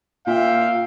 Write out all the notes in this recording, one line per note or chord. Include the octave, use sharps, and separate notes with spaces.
A#2 E5 F5 G5